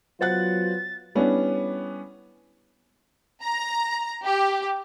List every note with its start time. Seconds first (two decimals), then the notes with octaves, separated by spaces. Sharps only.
0.21 F#3 B3 F4 C5 F#5 F#6 A6
1.15 G3 B3 C#4 D4 E4
3.43 A#5
4.24 G4